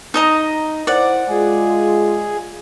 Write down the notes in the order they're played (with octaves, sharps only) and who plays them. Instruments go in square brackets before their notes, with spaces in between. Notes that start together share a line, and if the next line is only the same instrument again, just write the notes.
[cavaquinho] D#4 D#5 A#5
[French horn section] E4 C5 [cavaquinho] D5 F#5
[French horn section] G#3 F4 [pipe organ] G#4